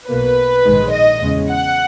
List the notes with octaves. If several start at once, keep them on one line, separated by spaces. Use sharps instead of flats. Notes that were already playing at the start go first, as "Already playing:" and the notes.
B1 B2 A#3 B4
A#1 G#2 D#3 G#3
D#5
E2 C#3 G#3
F#5